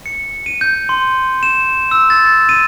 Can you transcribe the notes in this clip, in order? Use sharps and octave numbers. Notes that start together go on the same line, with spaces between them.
C#7
D#7
G6
C6
E7
E6
A6
D#7